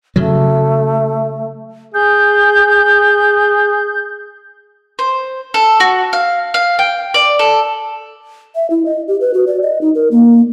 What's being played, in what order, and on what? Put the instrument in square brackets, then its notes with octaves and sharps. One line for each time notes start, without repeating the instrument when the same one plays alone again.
[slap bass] C#3 F#3 [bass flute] A3
[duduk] G#4 [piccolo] G6
[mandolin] C5
A4
F#4
F5
F5
G5
D5
A4
[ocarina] E5
E4
D#5
G4
B4
F#4
D5
D#5
D#4
A#4
A#3